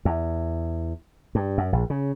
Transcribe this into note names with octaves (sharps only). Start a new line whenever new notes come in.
E2
G2
F#2
A#1
C#3